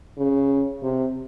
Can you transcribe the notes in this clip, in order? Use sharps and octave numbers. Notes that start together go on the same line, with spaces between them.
C#3
C3